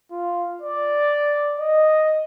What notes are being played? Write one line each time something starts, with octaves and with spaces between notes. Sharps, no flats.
F4
D5
D#5